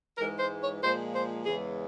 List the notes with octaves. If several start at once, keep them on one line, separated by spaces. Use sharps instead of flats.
G#2 E3 G#3 A#4
C5
C#5
A#2 F3 G#3 C5
C5
E2 C#3 E3 G#3 G#4